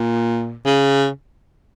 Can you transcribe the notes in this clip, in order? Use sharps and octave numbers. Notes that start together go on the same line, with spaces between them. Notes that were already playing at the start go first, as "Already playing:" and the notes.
Already playing: A#2
C#3